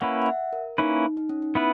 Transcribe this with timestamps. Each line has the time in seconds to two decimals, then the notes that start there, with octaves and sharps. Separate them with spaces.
0.01 A#3 C#4 E4 B4 F#5
0.22 F#5
0.26 E5
0.53 A#4
0.78 A#3 C#4 D#4 E4 B4
1.17 D#4
1.29 C#4
1.42 D#4
1.55 B3 C#4 E4 B4